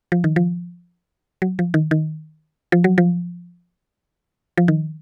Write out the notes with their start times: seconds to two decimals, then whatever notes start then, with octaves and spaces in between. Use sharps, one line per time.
0.12 F3
0.24 D#3
0.36 F3
1.42 F#3
1.59 F3
1.74 D#3
1.91 D#3
2.72 F3
2.84 F#3
2.98 F3
4.57 F3
4.68 D#3